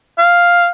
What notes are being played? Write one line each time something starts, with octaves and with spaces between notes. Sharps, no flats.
F5